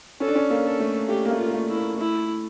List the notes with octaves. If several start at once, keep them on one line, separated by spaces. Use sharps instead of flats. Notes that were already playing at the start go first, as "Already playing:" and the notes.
C#4 A4
D4
C#4
A#3
A4
A3
A3 G4
A#3
A3
F4
A#3
A3
E4
A#3
A3 E4